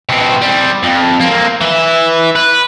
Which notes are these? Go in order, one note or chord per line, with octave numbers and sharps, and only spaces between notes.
B2 C4
G3 C4
F2
A#3 C4
E3 E5
B4